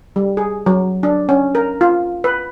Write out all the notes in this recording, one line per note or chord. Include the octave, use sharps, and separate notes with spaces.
G3
G#4
F#3
D4
C#4
A#4
F4
B4